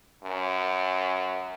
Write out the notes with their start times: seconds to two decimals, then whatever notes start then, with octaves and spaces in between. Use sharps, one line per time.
0.24 F#2